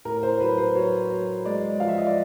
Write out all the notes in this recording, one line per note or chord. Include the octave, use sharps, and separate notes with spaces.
A2 A#4
C5
F#3 B4
C5
F#3 C#5
F#3
G#3 D5
F3 F5
E5
D#5
D5